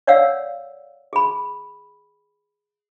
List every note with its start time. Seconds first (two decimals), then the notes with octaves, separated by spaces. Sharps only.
0.07 C#5 D5 F5 F#5 E6
1.13 G#4 B5